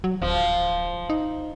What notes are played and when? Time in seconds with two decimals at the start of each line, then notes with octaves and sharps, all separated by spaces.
0.04 F#3
0.22 D1 F3
1.10 D#4